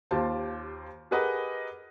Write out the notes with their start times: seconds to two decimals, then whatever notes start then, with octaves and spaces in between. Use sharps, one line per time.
0.11 D#2 F4 G4 C5 A5
1.11 G4 G#4 A#4 B4 D#5 F#5